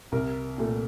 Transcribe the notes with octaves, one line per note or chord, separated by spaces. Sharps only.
C2 A#4
A#2 A3